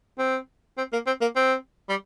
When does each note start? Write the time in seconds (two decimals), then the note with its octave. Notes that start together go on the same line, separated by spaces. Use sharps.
0.19 C4
0.78 C4
0.93 A#3
1.07 C4
1.21 A#3
1.36 C4
1.89 G3